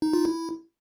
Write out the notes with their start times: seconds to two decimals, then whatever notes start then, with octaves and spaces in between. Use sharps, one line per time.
0.02 D#4
0.13 F4
0.25 E4